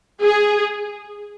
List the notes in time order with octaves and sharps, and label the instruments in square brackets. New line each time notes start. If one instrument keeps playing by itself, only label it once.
[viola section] G#4